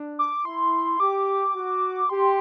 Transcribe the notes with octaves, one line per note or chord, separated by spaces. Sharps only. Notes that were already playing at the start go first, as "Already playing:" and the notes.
Already playing: D4
D6
E4 C6
G4 D6
F#4
G4 C6